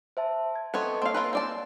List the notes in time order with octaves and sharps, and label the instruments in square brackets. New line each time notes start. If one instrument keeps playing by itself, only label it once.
[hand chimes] C5 E5 A5
G#6
[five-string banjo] B3 C4 C#5 [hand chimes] A4 D#5 A5
[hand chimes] A#3 C#5 E6 [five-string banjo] C4 F5
[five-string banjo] F4 A#4 B4
C4 D5 A5